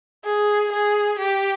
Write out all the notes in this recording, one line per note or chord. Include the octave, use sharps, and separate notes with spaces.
G#4
G#4
G4